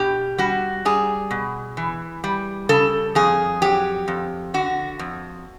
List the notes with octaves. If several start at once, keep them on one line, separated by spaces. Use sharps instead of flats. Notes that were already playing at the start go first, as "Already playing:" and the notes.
Already playing: B2 G4
G3 F#4
G3 G#4
B2
E3
G3
C#3 A4
F2 G#4
F#3 G4
F2
D3 F#4
F2